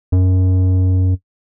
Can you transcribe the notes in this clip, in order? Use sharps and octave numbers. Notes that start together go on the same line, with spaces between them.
F#2